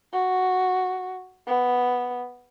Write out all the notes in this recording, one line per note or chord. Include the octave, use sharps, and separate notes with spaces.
F#4
B3